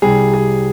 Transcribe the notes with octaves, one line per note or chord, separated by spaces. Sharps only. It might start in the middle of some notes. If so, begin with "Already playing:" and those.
C2 C3 G3 G#4
G#4